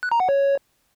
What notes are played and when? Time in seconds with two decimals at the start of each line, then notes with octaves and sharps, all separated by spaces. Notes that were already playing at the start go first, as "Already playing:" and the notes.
0.03 F#6
0.11 A#5
0.20 F#5
0.29 C#5